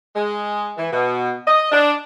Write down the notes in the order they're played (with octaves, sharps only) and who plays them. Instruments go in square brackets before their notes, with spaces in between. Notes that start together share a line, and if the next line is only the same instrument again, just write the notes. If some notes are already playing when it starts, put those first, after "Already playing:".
[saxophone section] G#3
E3
B2
D#5
D4